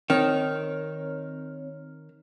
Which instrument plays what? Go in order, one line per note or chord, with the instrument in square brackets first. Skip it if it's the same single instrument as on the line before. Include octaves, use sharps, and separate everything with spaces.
[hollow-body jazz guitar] D#3 [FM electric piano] C4 C#5 F6